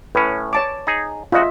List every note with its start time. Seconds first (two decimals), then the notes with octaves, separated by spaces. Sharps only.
0.15 A2 C#4 B4
0.53 C#5 A5 D6
0.87 D#4 G#4
1.32 C#3 F4 F#4 D#5 E5